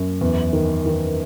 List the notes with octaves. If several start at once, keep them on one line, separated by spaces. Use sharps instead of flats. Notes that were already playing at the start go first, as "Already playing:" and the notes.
Already playing: F#2
E2
D#3
D#3